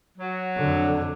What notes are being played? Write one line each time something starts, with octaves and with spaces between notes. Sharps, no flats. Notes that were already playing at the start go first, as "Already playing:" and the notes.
F#3
F2 D3